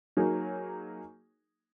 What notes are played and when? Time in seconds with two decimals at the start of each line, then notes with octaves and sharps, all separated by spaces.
0.17 F#3 A#3 D#4 G#4 C#5